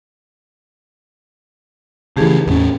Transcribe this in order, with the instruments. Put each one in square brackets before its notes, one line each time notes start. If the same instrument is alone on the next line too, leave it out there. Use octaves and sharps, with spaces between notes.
[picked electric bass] C#3 E3 [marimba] A3 G4 G#4
[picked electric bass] E2 A2 C#4